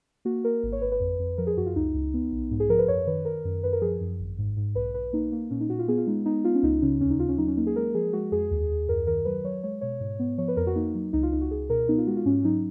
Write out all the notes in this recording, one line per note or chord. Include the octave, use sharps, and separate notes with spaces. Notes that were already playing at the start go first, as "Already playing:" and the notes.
A#3 F#4
A#3 A#4
G#1
C#5
G#1 B4
B4
F2
F2
F3 A#4
G#4
F#2 F#4
F4
C#2 D#4
C#2
B3
B1
G#2
G#4
F3 A#4
B4
F#2 C#5
D#3 B4
D#3 A#4
F#2
F#2 B4
A#4
F3 G#4
F#2
G#1
G#2
G#2
B1 B4
B1 B4
A#3 D#4
A#3
A#2 C#4
D#4
A#2 F#4
F4
B3 G#4
F4
G#3 D#4
B3 D#4
B3 F4
C#4
C#2 D#4
C#3 C#4
D#2 C#4
D#4
D#2 F4
C#4
F#3 D#4
C#4
A#3 D#4
G#4
G#3 A#4
F3 G#4
G#3 F#4
F2 G#4
D#2
D#2
F#2 A#4
D#3 A#4
F#3 B4
F#3 C#5
G#3 C#5
B2 C#5
G#2
B3
F3 C#5
B4
F2 A#4
F#4
A#3 D#4
F#3
C#2 D#4
F4
C#2 D#4
F#4
C#2 G#4
B2 A#4
B3 D#4
F4
G#3 F#4
F4
G#2 C#4
F#3 D#4